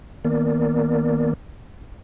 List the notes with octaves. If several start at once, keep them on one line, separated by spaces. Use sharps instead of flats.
D#3 A#3 B3 A#4 D5